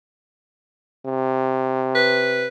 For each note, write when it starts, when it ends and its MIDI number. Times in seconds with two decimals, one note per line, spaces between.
1.06 2.48 48
1.95 2.48 71